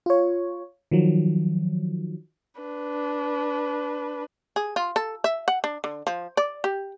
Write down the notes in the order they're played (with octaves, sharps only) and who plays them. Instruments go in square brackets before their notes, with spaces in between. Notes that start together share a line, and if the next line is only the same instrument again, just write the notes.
[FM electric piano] F4 C#5
D#3 F3 F#3
[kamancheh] D4 B4
[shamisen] G#4
F4
A4
E5
F#5
D4
D3
F3
D5
G4